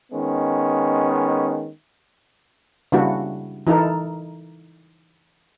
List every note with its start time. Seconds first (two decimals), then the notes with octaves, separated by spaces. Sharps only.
0.12 D#3 G#3 B3 C#4
2.92 C#3 G3 A#3 D4 E4 F#4
3.67 E3 D#4 E4 A4 A#4